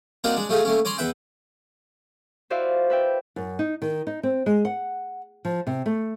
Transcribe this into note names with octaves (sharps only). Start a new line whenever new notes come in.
A#3 C4 D4 D#4 F4 F#4
G#3 D4
F#3 A3 D#4 F4 G#4
A3 A#3 C#4
C#4 D5 A#5 C6
E2 B4 E5 G5
E4 F#4 C5 D5 E5 F5
B4 E5 G5
F#2
D#4
D#3
D#4
C4
G#3
F#5
F3
C3
A3